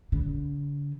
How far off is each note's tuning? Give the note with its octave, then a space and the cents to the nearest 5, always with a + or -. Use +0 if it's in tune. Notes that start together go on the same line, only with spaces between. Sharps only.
D3 -40